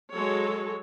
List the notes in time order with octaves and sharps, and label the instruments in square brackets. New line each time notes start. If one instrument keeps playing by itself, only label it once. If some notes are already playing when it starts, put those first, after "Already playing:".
[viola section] F#3 G#3 A4 C#5